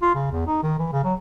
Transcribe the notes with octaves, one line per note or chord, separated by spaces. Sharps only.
F4
C#3
E2
D#4
D#3
E3
C#3
F#3